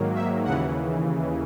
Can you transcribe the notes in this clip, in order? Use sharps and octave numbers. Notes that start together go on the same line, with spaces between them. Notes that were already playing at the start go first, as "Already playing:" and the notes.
Already playing: G#2 D#3 F#3 A#3
E5
D#2 C#3 E3 F#5